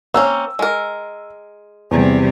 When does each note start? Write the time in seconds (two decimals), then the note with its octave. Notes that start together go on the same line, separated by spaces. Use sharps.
0.14 A#3 C4 C#4 E6
0.59 G#3 A#4
1.91 E2 C3 G3